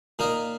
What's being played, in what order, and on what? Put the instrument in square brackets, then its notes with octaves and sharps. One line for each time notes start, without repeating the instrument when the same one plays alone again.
[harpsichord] A#2 A#3 D#4 A#4 D#5